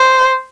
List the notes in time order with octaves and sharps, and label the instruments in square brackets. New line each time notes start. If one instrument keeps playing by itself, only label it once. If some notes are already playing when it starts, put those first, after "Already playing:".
Already playing: [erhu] C5